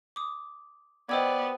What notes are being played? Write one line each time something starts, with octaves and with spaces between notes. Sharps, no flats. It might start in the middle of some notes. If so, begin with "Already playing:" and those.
D6 D#6
B3 F#4 G4 C5 D5 D#5 E6 G#6